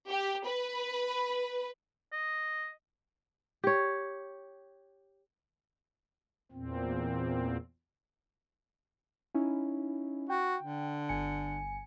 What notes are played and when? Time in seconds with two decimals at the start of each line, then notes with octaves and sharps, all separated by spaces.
0.10 G4
0.46 B4
2.12 D#5
3.64 G4 C#5
6.52 E2 A#2 C4
9.34 C#4 D#4 E4
10.29 F#4 G5
10.63 D3
11.09 G1 G#5 C#7